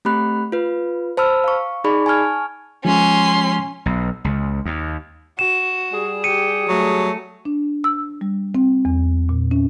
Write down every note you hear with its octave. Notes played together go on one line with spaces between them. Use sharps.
A3 C4 G4 B5 F#6
F4 B4
C5 A5 B5 E6 F6
F5 C#6
D#4 G#4 D5 B5 C#6
G#5 A5 C#6 F6 G#6
F3 G#3 C#4 C6
B1
C#2
D#2
F#4 E7
G3 G#4
G4 C#7 D#7
F#3 A3
D4
E6
G3
C4
E2
A#2
C#4